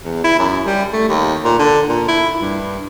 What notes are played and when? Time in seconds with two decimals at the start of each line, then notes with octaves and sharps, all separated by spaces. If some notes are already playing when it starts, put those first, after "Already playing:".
0.04 E2
0.24 E4
0.39 F#2
0.66 G3
0.93 A3
1.09 D#2
1.44 A#2
1.59 D3
1.88 A#2
2.08 E4
2.41 G2